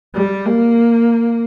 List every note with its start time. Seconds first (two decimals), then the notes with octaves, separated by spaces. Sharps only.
0.15 G3
0.46 A#3